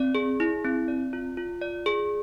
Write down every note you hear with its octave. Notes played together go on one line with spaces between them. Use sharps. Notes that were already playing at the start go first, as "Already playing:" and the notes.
Already playing: C4 D5
G#4
E4
C4
D5
F4
F4
D5
G#4